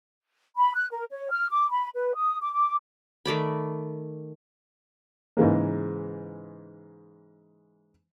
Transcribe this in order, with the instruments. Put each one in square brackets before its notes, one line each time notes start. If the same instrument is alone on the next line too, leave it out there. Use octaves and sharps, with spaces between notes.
[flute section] B5
F#6
A#4
C#5
F6
D6
B5
B4
D#6
D6
D6
[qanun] D#3 A3 D5 B5
[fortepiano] G#2 C#3 E3 G#3 A#3